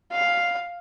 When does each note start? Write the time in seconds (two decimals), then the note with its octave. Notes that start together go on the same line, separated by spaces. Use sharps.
0.12 F5